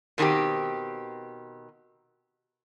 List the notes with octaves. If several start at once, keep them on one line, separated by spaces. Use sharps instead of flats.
B2 D#3 G3 C4 G4